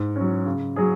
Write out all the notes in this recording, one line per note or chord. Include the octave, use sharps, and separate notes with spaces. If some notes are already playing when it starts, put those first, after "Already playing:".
Already playing: G#2
F#3 C#4
C#3
F#3 C#4 G#4